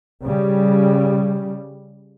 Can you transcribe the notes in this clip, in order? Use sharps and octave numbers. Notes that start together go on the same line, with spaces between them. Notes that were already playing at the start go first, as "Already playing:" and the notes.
C#3 G3